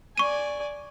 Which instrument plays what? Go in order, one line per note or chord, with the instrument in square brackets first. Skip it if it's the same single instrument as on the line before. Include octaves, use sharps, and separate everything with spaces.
[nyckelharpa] D5 G#5 [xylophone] C#6 D#7